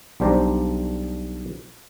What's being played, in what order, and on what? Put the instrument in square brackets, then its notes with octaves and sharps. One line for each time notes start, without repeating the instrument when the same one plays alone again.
[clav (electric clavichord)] B1 G3 D4 C5 D5 A#5